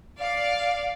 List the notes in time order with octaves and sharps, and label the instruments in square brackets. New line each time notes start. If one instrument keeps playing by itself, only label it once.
[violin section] D5 F5